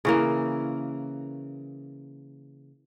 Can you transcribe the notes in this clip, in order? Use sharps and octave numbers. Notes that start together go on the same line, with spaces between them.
C#3 E3 A#3